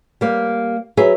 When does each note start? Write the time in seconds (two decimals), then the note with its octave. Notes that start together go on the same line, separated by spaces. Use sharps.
0.21 G3 A#3
0.97 F#3 G#4 B4 E5